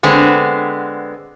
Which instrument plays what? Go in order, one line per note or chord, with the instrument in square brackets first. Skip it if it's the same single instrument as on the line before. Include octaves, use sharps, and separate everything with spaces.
[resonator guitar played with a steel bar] D3 G#3 B3 C4